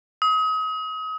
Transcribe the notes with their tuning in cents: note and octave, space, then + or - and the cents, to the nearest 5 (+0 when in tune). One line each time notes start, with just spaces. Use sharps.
D#6 +35